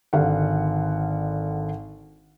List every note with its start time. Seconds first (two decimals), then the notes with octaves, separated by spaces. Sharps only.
0.13 G#1 D3 F5 F#5